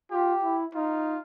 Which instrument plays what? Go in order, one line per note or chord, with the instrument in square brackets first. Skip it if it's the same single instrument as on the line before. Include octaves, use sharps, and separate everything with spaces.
[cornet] F4 [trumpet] G4
[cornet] E4
[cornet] D#4 [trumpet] F4